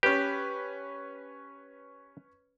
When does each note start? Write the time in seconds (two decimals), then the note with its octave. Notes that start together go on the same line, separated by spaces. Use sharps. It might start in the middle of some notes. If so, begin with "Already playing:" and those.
0.03 C#4 G4 B4